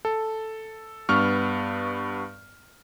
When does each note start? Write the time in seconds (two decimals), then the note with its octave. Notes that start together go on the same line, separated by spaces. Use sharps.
0.05 A4
1.09 G2 B3 C#6 F6